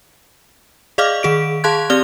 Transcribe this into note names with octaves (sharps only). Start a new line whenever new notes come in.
G#4 D5 D#5 F5 D6 F6
D#3 G#4 D7
G#4 F5 A5 C6 F#6 G#6
C4 G4 D5 F6 G7